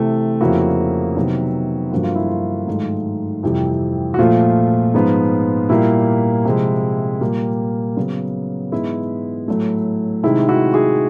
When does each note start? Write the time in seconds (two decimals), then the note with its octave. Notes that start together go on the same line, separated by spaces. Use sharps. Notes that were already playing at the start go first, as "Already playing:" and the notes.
Already playing: C3 E3 A3
0.41 F2 C#3 F3 A#3 E4 F#4
1.16 C3 D#3 F#3 B3
1.92 G2 D3 F3 A#3 F#4
2.03 F4
2.15 E4
2.27 F4
2.67 G#2 D#3 F#3 A3
3.43 F2 C3 E3 G3
4.14 F#4
4.19 A#2 F3 A3 F4
4.94 G#2 F3 G#3 B3
5.69 A#2 G3 A#3 E4
6.45 C3 F3 G#3
7.21 A#2 G3 A#3
7.97 C#3 F#3 B3
8.72 G#2 E3 G#3 B3 E4
9.48 A2 F#3 A3
10.23 C3 D#3 G#3 E4
10.48 E4 F#4
10.74 F#4 G#4